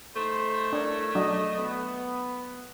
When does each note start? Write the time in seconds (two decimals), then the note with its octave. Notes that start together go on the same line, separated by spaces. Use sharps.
0.16 A3 D#4 C5 C6
0.73 D4 E4 A#4 C#5
1.15 F#3 D4 D#5
1.57 B3